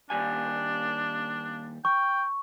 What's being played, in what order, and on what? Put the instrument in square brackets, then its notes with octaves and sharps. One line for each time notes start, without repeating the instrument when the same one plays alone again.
[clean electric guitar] D#2 G3 G#5 [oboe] D4
[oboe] G5 [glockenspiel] C#6